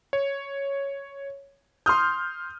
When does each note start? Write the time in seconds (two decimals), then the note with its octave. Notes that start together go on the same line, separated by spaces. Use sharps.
0.13 C#5
1.86 C6 D#6 F6 G6